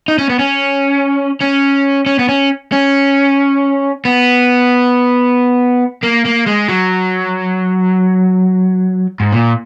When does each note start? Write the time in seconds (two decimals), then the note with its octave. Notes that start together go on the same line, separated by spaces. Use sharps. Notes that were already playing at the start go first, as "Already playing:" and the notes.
0.08 D#4
0.19 C#4
0.30 B3
0.39 C#4
1.41 C#4
2.06 C#4
2.19 B3
2.29 C#4
2.72 C#4
4.05 B3
6.03 A#3
6.25 A#3
6.46 G#3
6.68 F#3
9.20 G#2
9.33 A#2